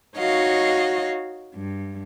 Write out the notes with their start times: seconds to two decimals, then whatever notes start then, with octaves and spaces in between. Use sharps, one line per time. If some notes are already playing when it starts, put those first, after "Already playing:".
0.17 D#4 F#4 C#5 D#5 F5
1.54 G2